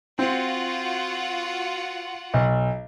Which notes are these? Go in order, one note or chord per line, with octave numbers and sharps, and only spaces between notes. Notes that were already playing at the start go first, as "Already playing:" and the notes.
C4 F4 F#4 F#5
B1